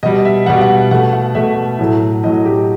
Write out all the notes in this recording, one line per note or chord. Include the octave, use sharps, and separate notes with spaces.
B2 G3 D#5
E5
B2 G3 F#5
F#5
B2 A3 F#5
F#5
B2 A3 E5
A2 F#3 A3
A2 F#3 A3 D#5
G4